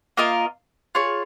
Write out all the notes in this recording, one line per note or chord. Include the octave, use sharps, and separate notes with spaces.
A#3 F4 A#4 D#5
F4 G#4 C#5